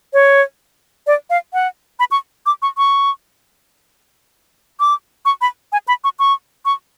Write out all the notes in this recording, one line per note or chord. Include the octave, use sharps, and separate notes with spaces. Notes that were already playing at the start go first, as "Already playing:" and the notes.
C#5
D5
F5
F#5
B5
C#6
D6
C#6
C#6
D6
C#6
B5
G#5
B5
C#6
C#6
C#6